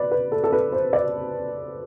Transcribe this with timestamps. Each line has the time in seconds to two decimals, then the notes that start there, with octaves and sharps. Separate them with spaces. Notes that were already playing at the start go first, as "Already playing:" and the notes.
Already playing: B4 D5
0.11 B4
0.32 A4
0.44 A4
0.52 B4
0.72 C5
0.93 D5